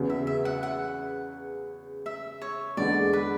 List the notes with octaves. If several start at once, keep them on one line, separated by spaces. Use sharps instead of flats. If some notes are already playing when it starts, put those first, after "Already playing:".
Already playing: E2 C#3 F#3 B3
E5
E5
F#5
F#5
E5
C#5
E2 D3 G#3 D5
B4